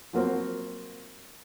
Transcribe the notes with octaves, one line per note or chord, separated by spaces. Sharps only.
F3 F#3 A#3 C4